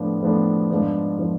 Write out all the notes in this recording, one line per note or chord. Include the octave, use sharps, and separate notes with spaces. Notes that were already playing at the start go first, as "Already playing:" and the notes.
Already playing: A2 F3 B3 D4
A2 F3 B3 D4
G#2 F3 B3 D4
F3 B3 D4